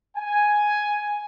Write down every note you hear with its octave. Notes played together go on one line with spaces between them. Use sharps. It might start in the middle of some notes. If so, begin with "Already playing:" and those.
G#5